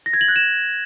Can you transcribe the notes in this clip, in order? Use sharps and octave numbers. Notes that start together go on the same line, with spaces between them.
A#6
G#6
F#7
F#6
E7